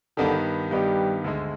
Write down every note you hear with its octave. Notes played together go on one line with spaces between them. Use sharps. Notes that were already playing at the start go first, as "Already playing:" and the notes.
G2 D3 D#3 B3 D#4 G4
G2 D#3 G3 B3 D#4 G4
D2 D3 G#3